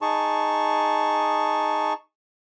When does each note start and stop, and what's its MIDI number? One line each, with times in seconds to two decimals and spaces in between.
0.02 1.93 63
0.02 1.93 68
0.02 1.93 81
0.02 1.93 85